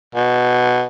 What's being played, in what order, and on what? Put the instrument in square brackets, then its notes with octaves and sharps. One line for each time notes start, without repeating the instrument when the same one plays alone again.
[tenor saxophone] B2